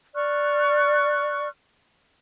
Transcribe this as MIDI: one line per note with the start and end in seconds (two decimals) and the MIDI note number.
0.15 1.48 74
0.15 1.48 85
0.15 1.48 89
0.15 1.48 90